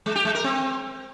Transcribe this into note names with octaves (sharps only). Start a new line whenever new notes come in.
G#3
G4
G#3
A#4
C4